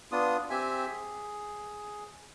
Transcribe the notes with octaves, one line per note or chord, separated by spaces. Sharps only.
B3 D4 F4 D#6
C4 G4 E5 G#5
G#4